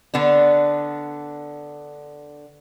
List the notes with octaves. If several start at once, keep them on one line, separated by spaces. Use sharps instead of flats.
D3 B3 D4